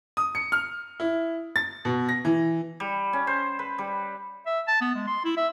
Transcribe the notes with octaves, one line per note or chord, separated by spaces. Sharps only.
D#6
C#7
F6
E4
A6
B2
A#6
E3
G3
C#4
C5
B4
G3
E5
A5
B3
G#3
C6
E4
E5